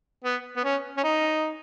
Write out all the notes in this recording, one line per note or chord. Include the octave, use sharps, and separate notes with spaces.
B3
B3
C#4
C#4
D#4